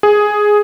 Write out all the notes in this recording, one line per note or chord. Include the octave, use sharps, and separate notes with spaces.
G#4